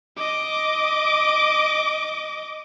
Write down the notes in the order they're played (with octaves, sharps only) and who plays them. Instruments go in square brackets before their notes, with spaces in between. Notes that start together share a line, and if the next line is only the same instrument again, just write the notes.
[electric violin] D#5 D6